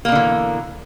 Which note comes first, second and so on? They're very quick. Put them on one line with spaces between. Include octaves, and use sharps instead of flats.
A#3 B2 D3 E3